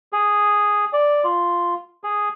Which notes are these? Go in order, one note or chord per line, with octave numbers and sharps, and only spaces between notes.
G#4
D5
F4
G#4